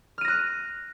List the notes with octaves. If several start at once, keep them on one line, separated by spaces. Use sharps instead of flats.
F6 F#6 A#6 D#7